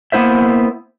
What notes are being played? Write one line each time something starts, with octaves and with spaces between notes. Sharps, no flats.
A#3 B3 E4 C5 E5